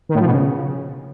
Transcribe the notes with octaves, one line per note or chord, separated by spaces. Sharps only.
D#3
A2
F3
B2
C#3